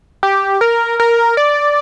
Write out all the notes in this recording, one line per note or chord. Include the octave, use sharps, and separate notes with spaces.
G4
A#4
A#4
D5